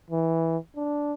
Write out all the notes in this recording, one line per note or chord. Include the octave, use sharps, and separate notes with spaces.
E3
D4